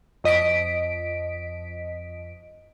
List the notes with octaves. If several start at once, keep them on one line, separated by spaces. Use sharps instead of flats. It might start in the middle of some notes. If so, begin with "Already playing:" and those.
F2 D#5 B6 D7